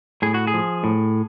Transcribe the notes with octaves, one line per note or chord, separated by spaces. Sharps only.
A2 G#4
F#4
G#4
F3
A2